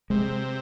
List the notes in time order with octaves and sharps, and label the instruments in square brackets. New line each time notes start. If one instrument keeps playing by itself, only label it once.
[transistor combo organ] C3 [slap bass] G#3